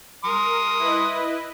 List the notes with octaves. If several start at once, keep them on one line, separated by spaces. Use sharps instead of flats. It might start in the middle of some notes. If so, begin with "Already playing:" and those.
A#4 C6 D#6
E4 B4 D#5